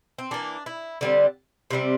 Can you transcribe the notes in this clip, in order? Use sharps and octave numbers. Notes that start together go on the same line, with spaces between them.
C4
E3 A#3 D4
E4
D3 G3 C4
C3 G3 C4